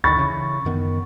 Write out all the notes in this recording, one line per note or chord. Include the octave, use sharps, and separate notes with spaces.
D2 D3 D#3 B5 C#6 A6
C#3 E3
F#2 D#3 B3